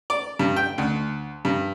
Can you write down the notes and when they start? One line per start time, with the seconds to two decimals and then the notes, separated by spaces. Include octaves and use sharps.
0.10 D5
0.39 G2
0.56 G5
0.78 D2
1.45 G2